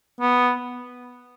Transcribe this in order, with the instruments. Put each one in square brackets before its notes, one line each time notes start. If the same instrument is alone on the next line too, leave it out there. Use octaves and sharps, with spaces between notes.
[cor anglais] B3